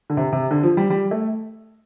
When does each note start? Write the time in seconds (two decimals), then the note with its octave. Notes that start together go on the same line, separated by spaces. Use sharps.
0.10 D3
0.17 C3
0.32 C3
0.51 D3
0.63 F3
0.77 G3
0.90 G3
1.11 A3